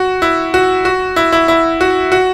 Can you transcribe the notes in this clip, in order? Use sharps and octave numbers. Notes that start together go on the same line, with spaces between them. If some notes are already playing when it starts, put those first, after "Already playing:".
Already playing: F#4
E4
F#4
F#4
E4
E4
E4
F#4
F#4